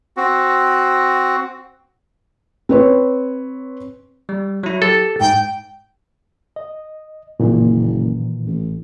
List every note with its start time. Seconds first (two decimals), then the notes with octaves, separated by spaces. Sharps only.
0.17 C4 F#4
2.69 C4 B4 C#5
4.29 G3
4.63 F#3 E4
4.82 G4 A4
5.21 G#2 G5
6.56 D#5
7.40 F#1 A#2 D#3 E3
8.46 A1